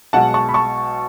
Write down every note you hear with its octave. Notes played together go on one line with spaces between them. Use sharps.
B1 B2 G#3 F#5 A5
A5 C#6
B5
A5 C#6